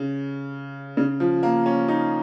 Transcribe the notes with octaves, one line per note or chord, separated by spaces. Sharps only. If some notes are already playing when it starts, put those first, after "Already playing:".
Already playing: C#3
C#3
F3
A#3
C#4
D#4